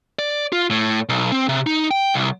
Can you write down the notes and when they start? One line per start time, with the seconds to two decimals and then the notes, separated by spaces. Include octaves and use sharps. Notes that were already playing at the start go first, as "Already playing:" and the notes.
0.19 D5
0.52 F4
0.71 A2
1.09 B1
1.32 C4
1.49 C3
1.67 D#4
1.91 G5
2.14 C2